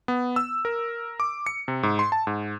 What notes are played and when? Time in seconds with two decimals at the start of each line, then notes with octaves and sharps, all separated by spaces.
0.08 B3
0.36 E6
0.65 A#4
1.20 D6
1.46 C#7
1.68 C3
1.83 G#2
1.99 C6
2.12 A5
2.27 G#2